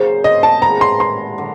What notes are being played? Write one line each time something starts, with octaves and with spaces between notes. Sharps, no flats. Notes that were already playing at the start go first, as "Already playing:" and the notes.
Already playing: C#3 F#3 A#3 C#4 C5
D#5
A5
D#3 G#3 B3 E4 A#5
C6
C6
D3 F#3